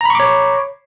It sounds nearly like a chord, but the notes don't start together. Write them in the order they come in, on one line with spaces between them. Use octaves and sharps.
A#5 B5 C#6 D6 C#5